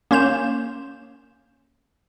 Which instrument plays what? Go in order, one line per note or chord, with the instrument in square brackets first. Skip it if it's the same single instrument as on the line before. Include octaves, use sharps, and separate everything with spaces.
[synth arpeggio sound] A#3 C#4 C6 G6 E7